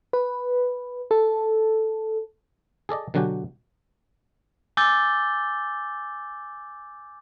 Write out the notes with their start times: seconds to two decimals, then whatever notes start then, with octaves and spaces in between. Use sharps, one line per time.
0.13 B4
1.11 A4
2.89 G#4 A4 D5 D#5
3.14 B2 D3 F#3 F#4 G4 G#5
4.77 G#5 D6 E6 G6 A6 G7